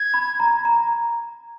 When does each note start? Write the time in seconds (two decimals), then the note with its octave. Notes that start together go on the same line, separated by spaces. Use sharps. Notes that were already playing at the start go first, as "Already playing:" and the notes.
Already playing: G#6
0.14 B5
0.40 A#5
0.65 A#5